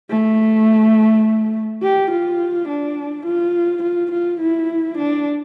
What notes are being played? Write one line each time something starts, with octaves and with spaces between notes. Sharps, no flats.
A3
G4
F4
D4
F4
F4
F4
E4
D4